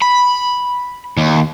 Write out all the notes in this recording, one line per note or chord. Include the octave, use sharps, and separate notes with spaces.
B5
D#2